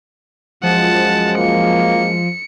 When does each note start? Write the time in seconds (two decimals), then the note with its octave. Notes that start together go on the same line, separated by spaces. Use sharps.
0.63 F#2 F3 G#3 F#5 A5
1.39 A#3 C#7